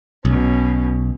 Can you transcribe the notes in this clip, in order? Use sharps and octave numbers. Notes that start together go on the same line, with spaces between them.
B1 B2 C#4